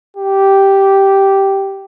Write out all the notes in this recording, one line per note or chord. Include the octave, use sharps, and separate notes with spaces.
G4